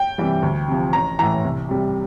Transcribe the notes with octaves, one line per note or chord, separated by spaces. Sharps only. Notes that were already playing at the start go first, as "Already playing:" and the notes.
Already playing: G5
C3 E3 G3
D2
C3 F3
A1 A#5
A2 E3 A#5
C2
C3 G3